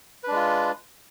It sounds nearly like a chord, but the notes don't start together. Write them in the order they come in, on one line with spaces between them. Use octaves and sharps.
B4 D4 G#3 F4